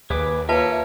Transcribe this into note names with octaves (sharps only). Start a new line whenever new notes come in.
D#2 G#4 B4 D6
A#3 F4 B4 C#5 E5 A5